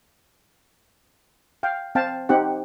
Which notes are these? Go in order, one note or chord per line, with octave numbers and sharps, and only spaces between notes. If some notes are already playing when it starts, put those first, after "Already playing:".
F5 G5
C4 F5 G5 A5
C4 D#4 G4 F#5